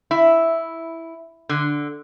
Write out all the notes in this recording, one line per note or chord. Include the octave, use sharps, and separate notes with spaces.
E4
D3